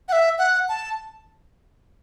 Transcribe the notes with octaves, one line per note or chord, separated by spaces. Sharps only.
F#5
E5
F#5
A5